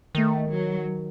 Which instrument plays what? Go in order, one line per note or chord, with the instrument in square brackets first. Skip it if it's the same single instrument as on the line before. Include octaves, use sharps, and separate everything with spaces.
[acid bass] D#3 [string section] A3
[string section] F#3